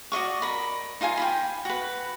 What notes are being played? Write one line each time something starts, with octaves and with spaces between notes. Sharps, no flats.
F#4 D5 D#5 C#6
A#4 B5
D#4 F4 F5 G#5
G5 G#5 B5
F#4 B4